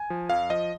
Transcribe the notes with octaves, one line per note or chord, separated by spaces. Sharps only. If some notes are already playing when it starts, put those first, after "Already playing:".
Already playing: G#5
F3
F2 F5
F3 D#5